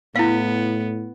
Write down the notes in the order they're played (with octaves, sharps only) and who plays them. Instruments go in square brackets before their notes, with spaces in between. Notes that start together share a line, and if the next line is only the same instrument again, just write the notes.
[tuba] A2 [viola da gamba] B3 [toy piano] E4 F5